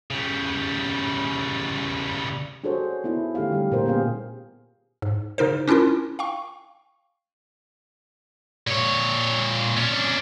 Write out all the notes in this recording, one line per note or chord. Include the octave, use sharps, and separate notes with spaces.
C#3 G3
D4 F#4 G#4 A4 C5 C#5
B3 D#4 E4 A4
D3 A3 G4 A4 F5
G3 G4
A#2 G4 A#4 C5
B3 C#4 G4 G#4 F5
G#2
C#3 D#4 A#4 C5
C#4 D4 E4 F4 A#4
F5 G5 C#6
A#2 C#5
C#4 D4